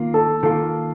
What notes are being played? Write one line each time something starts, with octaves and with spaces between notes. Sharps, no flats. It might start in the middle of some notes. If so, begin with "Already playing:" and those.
Already playing: D#3 A#3 F4
A4
D#3 A#3 F4 A4